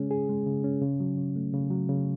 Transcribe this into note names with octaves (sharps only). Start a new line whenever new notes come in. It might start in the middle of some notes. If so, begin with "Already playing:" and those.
Already playing: C#3 G#3 C#4 G#4
G#4
G#3
C#3
C#4
C#3
F#3
C#3
A3
C#3
F#3
C#3